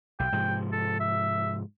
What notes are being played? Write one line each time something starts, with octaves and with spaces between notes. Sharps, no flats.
B1 G5
G#2 C3 F3
A4
E5